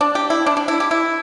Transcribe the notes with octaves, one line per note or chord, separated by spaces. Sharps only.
D4
G4
E4
D4
D4
E4
G4
E4